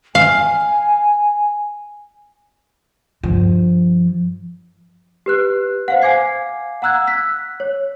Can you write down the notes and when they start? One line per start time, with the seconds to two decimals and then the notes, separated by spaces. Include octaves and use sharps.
0.15 F5 G#5
3.23 G2 F3
5.26 G4 B4 F#6
5.88 C5 F5 F#5
6.02 F5 G#5 D6 G#6 C7
6.82 F#5 A#5 E6 F#6 G#6
7.07 E6 F#6 B6
7.60 C#5